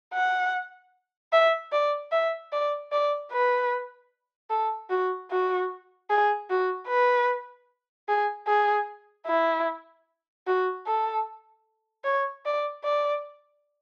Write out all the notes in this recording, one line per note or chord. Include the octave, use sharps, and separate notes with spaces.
F#5
E5
D5
E5
D5
D5
B4
A4
F#4
F#4
G#4
F#4
B4
G#4
G#4
E4
F#4
A4
C#5
D5
D5